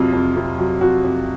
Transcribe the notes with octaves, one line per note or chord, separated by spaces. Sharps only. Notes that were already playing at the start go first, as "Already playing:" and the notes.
Already playing: F2 C3 F#3 F4
F2
C3
F#3
F2 F#4
F2